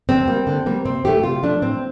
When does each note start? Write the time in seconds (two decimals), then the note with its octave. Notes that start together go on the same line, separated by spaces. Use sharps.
0.09 D3 C4
0.28 G3 A#3
0.47 D3
0.66 G3 A#3
0.85 C3 C4
1.05 D#3 A3 G4
1.23 C3 F4
1.43 F3 A3 D4
1.62 A2 C4